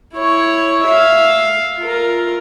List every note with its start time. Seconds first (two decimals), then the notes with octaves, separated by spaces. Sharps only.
0.15 E4 C#5
0.85 E5 F5
1.79 F4 A#4